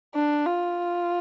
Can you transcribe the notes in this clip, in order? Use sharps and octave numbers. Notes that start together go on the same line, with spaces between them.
D4
F4